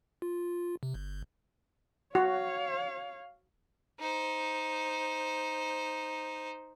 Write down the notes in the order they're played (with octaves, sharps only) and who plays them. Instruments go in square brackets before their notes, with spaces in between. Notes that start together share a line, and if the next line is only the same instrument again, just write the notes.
[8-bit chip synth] F4
C3
G1
[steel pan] F#4 [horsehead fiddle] C#5 F5
[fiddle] D#4 C5